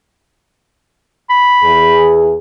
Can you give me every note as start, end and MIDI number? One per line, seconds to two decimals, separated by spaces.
1.30 2.13 83
1.61 2.36 40
1.61 2.36 68